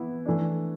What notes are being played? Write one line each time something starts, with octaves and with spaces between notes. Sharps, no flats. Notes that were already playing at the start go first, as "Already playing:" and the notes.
Already playing: E3 B3 E4
E3 A3 D4